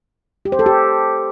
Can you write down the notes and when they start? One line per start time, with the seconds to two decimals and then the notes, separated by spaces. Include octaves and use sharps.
0.45 G4
0.52 C5
0.59 A4
0.66 G4